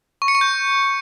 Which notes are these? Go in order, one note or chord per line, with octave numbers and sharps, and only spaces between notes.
C#6
C#7
C#6
G6